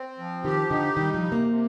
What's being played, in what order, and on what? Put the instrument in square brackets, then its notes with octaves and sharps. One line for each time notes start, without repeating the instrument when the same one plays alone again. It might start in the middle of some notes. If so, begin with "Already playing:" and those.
Already playing: [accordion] C4
F3
[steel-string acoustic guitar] D#3 [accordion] G4
[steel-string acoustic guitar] D3 [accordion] D#4
[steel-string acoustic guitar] D#3 [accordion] G3
[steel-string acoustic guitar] F3
[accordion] C3
[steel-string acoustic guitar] A#3
[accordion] C3